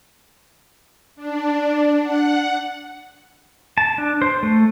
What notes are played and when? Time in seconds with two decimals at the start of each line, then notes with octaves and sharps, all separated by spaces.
1.16 D4
2.03 F#5
3.78 A5
3.98 D4
4.22 C5
4.43 A3